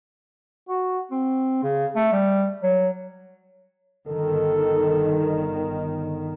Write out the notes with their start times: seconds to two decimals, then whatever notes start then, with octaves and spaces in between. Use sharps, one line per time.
0.69 F#4
1.11 C4
1.63 C#3
1.96 A3
2.12 G3
2.63 F#3
4.08 G1 D#3 A4